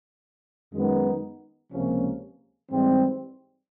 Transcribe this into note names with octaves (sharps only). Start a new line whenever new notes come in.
F#2 D#3 G#3 B3 D#4
C#2 C3 F3 A#3 C#4
G#2 E3 G3 C4